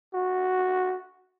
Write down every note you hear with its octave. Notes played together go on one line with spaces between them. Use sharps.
F#4